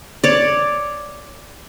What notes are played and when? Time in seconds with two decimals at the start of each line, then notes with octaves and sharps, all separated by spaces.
0.24 C#5 D5